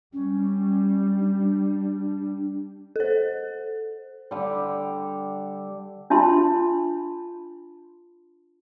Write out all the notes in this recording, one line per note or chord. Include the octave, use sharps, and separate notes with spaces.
G3 C#4
D4
A4 C5
D3 G3
D4 F4 E5 A5 B5 C6